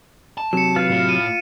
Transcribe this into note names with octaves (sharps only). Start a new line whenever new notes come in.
A5
C3 F#3 C#7 E7
F4 B4 F5
A2
D#7